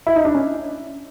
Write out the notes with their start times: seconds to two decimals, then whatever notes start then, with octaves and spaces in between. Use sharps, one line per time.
0.07 E4
0.16 D#4
0.25 D4
0.35 C#4